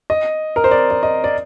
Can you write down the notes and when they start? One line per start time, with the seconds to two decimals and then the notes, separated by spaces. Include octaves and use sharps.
0.10 D#5
0.56 A#4
0.64 C5
0.71 D5
0.91 D5
1.03 D#5
1.24 D5